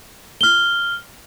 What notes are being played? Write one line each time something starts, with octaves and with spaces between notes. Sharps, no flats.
F6 G7